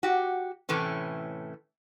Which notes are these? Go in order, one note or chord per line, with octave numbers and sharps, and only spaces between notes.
F#4 G4
A2 C3 E3 A3 C#4